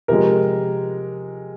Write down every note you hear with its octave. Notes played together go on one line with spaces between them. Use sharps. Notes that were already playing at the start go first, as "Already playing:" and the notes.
C3 F3 G#3 A#4